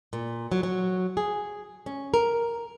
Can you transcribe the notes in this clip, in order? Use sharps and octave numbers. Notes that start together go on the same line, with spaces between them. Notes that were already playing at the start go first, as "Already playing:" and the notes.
A#2
F#3
F#3
G#4
C#4
A#4